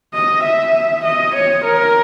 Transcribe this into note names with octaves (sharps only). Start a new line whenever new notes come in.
D#5
E5
D#5
C#5
A#4